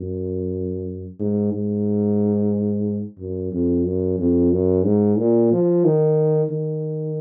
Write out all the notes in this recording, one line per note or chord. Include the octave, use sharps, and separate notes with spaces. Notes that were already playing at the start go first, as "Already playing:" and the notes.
Already playing: F#2
G#2
G#2
F#2
F2
F#2
F2
F#2
G#2
A#2
F3
D#3
D#3